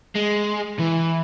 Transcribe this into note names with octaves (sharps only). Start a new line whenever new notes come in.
G#3
E3